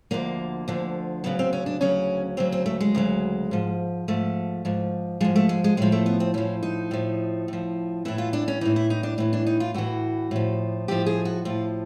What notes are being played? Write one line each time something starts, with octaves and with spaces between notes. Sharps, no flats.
D2 D3 F3 A#3
D2 D3 F3
D2 C#3 F#3 B3
C4
C#4
D4
D2 C#3 F#3 C#4
D2 C#3 F#3 C4
C4
A3
G#3
D2 C#3 F#3
G#2 F3
G#2 F3 A3
G#2 F3
G#2 F3 G#3
A3
G#3
G#3
A2 F3 G#3
A3
B3
C4
A2 F3 C#4
D#4
A2 F3
A2 F3
A2 E3 E4
F4
D4
C#4
A2 E3 D#4
E4
D#4
D4
A2 E3
D4
D#4
F4
A2 E3 F#4
A2 F3
A2 F3 G4
G#4
F#4
A2 F3 F4